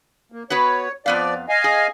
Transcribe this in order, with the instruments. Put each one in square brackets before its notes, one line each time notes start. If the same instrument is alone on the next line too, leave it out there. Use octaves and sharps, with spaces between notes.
[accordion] A#3
[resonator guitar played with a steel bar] B3 F#4 B4 [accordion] C#5
[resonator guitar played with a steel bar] F2 B3 F5 [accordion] F3 D5
[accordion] D#5 F5 G#5
[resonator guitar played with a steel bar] G#4